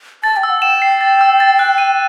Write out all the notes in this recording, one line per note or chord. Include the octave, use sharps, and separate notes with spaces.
A5 A6
G5
E6
F#5
G5 E7
C7
A6
E6
A6
F#6
D#7